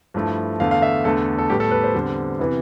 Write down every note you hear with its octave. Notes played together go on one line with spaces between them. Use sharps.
G2 F3 A3 E4
E2 D3 A3 F5
F5
E5
E2 D3 A3 A4
A4
A2 G3 B3 G4
A4
B4
C5
E2 D3 G3 C4
C3 E3 B3 E4